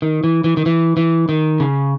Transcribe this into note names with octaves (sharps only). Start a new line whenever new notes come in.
D#3
E3
E3
D#3
E3
E3
D#3
C#3